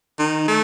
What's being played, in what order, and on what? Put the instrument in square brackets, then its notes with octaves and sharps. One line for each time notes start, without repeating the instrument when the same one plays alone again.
[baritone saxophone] D#3
A3